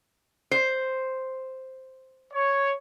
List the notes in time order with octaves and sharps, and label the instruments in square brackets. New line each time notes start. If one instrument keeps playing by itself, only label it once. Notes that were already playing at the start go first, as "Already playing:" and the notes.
[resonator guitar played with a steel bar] C5
[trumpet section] C#5